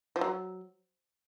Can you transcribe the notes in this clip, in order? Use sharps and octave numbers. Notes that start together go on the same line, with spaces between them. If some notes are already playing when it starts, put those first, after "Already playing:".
F3
F#3